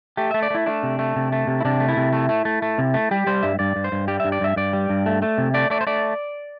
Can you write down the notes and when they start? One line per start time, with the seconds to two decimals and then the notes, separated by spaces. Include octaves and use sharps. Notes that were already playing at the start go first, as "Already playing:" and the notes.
0.17 A3 G4
0.31 A3 E5
0.43 D5
0.50 A3 E4
0.66 A3 D4
0.83 C3
0.99 A3
1.16 C3
1.32 A3
1.47 C3
1.60 E4
1.65 C3 D4
1.80 A3
1.89 E4
1.97 C3
2.13 A3
2.29 A3
2.45 A3
2.62 A3
2.78 C3
2.94 A3
3.11 G3 G4
3.27 G3 C5
3.43 G2 E5
3.59 G2 D5
3.76 G2
3.84 C5
3.92 G2
4.08 G3 G4
4.20 G2 E5
4.32 D5
4.41 G2 E5
4.56 G2 D5
4.73 G3
4.90 G2
5.06 A3
5.22 A3
5.38 C3
5.54 A3 D5
5.70 A3 D5
5.81 C5
5.87 A3 D5